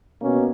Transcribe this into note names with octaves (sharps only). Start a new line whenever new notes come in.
B2 A#3 C#4